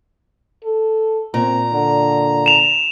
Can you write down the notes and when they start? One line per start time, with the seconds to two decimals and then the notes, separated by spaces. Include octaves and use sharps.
0.65 A4
1.34 A#2 C4 A#5
1.73 D3
2.46 E7 F7